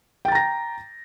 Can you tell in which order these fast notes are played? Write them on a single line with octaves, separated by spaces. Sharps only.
G5 A6 A#5 A#6